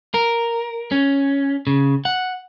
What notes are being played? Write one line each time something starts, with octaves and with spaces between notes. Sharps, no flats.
A#4
C#4
C#3
F#5